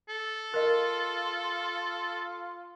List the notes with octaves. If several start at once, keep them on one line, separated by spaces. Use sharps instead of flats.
A4
F4 A#4 D#5